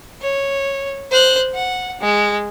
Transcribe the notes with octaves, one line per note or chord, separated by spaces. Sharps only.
C#5
C5 F#6
F#5
G#3